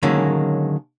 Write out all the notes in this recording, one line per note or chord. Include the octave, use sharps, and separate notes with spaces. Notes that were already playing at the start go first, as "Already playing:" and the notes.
D3 D#3 F#3 G#3 A#3 C#4